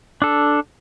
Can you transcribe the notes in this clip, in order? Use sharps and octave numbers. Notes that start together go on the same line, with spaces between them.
D4 A4